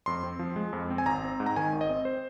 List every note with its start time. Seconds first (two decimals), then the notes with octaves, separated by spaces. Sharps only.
0.06 F2 C6
0.24 C4
0.39 F3
0.56 G#3
0.73 F2
0.90 C4
0.98 G#5
1.06 G#1 A#5
1.23 C4
1.40 G#2
1.46 A#5
1.56 D#3 G#5
1.73 G#1
1.81 D#5
1.90 C4
2.05 C5